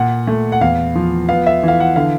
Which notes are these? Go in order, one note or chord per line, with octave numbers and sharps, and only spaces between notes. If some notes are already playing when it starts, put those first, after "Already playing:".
Already playing: A#2 F#5
A3
F#5
E2 F5
F3
B3 F5
E5
E3 F5
F#5
D3 F5